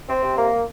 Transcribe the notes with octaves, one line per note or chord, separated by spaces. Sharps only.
C4
C3
A#3